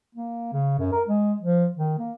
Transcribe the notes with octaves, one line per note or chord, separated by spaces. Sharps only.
A#3
C#3
F#2
A#4
G#3
F3
D#3
A#3